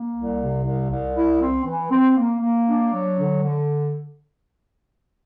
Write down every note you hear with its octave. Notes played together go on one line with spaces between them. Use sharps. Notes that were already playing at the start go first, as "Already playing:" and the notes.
Already playing: A#3
C2
C3
C2
C2
E4
C4
E3
C4
A#3
A#3
D4
F#3
D3
D3